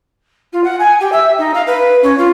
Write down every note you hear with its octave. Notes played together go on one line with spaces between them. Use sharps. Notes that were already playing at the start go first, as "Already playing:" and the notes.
F4
F#5
G#5
G4
E5
D#4
F5
B4
C#4
F4